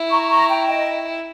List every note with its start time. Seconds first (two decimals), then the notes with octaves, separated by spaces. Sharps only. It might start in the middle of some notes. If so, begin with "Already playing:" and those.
Already playing: E4
0.11 A#5 C#6
0.29 A#5 C#6
0.49 G5 A#5
0.67 D#5 G5